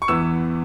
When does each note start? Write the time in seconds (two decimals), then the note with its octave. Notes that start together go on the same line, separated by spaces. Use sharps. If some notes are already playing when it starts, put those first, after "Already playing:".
0.02 C#6
0.08 E2 E3 B3 E6